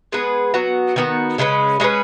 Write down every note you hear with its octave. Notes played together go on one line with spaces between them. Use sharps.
G#3 B3 G#4 B4
F#3 B3 F#4
D#3 B3 F#4
C#3 G#3 C#4 B4
G#3 C#4 G#4 B4